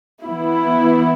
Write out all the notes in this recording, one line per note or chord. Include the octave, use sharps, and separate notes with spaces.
E3 B3 E4